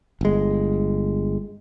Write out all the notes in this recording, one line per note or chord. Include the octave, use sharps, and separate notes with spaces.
G1 G#3